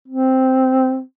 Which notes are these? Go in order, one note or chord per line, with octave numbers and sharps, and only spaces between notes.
C4